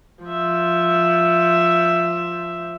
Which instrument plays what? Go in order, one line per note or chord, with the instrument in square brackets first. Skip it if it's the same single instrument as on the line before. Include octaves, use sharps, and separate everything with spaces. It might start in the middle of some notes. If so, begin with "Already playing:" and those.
[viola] F3 E5